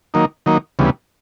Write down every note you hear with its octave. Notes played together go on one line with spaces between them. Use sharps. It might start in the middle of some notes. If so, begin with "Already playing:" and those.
D#3 F#3 A#3 D#4
D#3 F#3 A#3 D#4
D2 C#3 E3 G3 B3